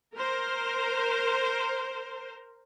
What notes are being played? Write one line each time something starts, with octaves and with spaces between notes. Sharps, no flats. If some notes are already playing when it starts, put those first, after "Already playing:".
A#4 C5